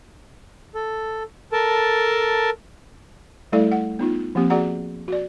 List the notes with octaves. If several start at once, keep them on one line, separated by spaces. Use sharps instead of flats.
A4
A4 A#4 A5
G3 A3 E4 A4 D5 F5
F#5
B3 D#4 F4
F3 A#3 C4 G4
F#4 G#4 D5 F#5 A#5
F#4 D5